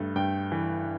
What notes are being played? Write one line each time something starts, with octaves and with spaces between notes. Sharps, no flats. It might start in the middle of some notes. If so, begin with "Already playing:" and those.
Already playing: G2 A3
G2 G5
E3